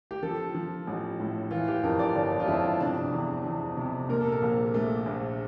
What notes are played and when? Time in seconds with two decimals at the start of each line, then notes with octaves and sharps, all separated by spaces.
0.11 G4
0.23 F3 A4
0.55 F3
0.87 A1
1.20 A2
1.51 E3 F4
1.68 G4
1.83 F2 A#4
1.99 D5
2.15 G1 D5
2.40 F4
2.48 F2 E4
2.80 C3 D4
3.12 E2
3.45 E2
3.77 C3
4.09 A#2 A#4
4.21 A4
4.32 A#4
4.42 A#1
4.74 A3
5.06 A#1